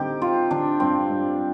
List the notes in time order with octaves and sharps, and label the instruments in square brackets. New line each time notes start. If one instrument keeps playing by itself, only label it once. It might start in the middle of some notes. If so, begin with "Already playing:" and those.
Already playing: [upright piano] D3 G3 C4 [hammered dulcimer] D#4 G4
[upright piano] C4 [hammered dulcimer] F4
[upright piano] D3 [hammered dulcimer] D4
[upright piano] G2 [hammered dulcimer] C4
[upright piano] G2